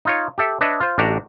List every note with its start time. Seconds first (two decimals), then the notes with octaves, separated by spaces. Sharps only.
0.05 D#4 F4 C#5
0.38 G4 A4 E5
0.61 D4 B4 C#5 D#5 E5
0.80 F4 C5
0.98 A1 D4 F#4 G4 A#5